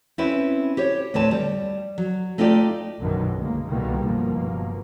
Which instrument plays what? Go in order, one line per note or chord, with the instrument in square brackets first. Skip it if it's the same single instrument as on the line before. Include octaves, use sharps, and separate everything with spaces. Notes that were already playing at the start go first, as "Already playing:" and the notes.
[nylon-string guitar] C4 C#4 E4 B4
G4 C5 C#5
D2 A2 C4 B4 C#5 A5
G3
F#3
A3 D#4 F4 G4 D5
[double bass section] B1 F#2 B2 D3 D#3
C#2 G#3 A#3
C2 B2 D3 D#3 G3 A#3
F#1 G2 B2 F3 A#3